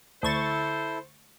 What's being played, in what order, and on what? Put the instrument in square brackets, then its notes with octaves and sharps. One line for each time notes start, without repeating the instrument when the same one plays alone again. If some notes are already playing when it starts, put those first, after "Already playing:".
[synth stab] D2 C#6 A6 [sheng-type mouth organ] E4 A4 [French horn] C5